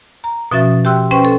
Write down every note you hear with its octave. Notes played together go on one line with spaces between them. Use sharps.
A#5
B2 F3 C#4 F#4 E5 A6
G4 E5 G5 C6 E6 F#6
C#4 B4 C5 G5 C6 C#6
A4